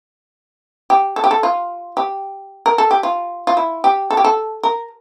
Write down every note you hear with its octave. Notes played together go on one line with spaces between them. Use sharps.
G4
A4
G4
A4
F4
G4
A#4
A4
G4
F4
F4
E4
G4
A4
G4
A4
A#4